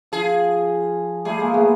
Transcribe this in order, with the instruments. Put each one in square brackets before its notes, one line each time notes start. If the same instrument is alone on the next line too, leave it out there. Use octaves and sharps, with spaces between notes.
[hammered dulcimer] F3 [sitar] G#4
[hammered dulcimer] G3 A3 [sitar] G#4
[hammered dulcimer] G#3 A#3
A3 B3